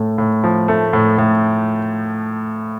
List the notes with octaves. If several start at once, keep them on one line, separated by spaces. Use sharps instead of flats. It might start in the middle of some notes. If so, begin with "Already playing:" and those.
Already playing: A2 A3
A2
F3
A3
A2
A2